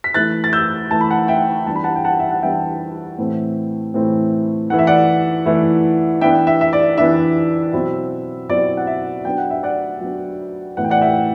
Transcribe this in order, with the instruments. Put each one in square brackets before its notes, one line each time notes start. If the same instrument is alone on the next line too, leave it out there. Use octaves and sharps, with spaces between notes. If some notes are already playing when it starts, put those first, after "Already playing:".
[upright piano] B6
E3 A3 E4 F#6 A6
A6
E6 G6
E3 A3 E4 A5
B5
F#5 A5
E5 G5
E3 G3 B3 D4 A5
B5
F#5 A5
G5
F#5 A5
E5
F#5
E3 G3 B3 D4 E5 G5
A2 E3 A3 C4
A2 E3 A3 C4
E3 A3 E4 F#5
E5
D5 F#5
E3 A3 E4
E3 B3 D4 E5 G5
E5
E5
D5
E3 B3 D4 E5
B2 F#3 C4 E4
B2 F#3 C4 E4 D5
F#5
E5
F#3 B3 D4 G5
F#5
E5
D5 F#5
F#3 B3 D4
A2 E3 B3 F#5
G5
D5 F#5
E5 G5